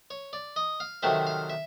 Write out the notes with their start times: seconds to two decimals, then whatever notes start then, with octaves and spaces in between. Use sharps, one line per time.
0.10 C#5
0.33 D5
0.56 D#5
0.80 F5
1.03 C3 D#3 F#3 A3 C4 E5
1.27 F5
1.49 E5